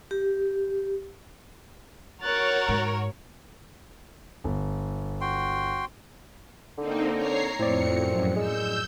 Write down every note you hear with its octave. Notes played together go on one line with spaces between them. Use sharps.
G4
F#4 A#4 C#5 F#6 A6
G#2
G1
F#4 G5 C6
D3 A#3 C4 D#4
C#5 A#5 C7
F2 A2 C4 D5 C#7
F#2
G#3 E6 G6